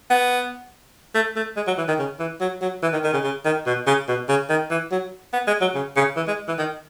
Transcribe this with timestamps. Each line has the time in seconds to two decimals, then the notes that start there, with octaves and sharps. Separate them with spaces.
0.10 B3
1.15 A3
1.36 A3
1.56 G#3
1.67 F#3
1.78 E3
1.88 D#3
1.99 C#3
2.19 E3
2.40 F#3
2.61 F#3
2.82 E3
2.93 D#3
3.04 D#3
3.13 C#3
3.24 C#3
3.45 D#3
3.66 B2
3.87 C#3
4.08 B2
4.29 C#3
4.49 D#3
4.70 E3
4.91 F#3
5.33 B3
5.47 G#3
5.61 F#3
5.75 C#3
5.96 C#3
6.16 E3
6.27 G#3
6.48 E3
6.58 D#3